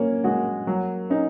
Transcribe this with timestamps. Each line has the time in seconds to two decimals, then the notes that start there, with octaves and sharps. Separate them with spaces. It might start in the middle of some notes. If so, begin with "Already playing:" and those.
Already playing: F#3 A#3 C#4 C#5
0.24 G#3 F#4 G#4
0.67 F#3 A#3 A#4
1.10 C#4 D#4 C#5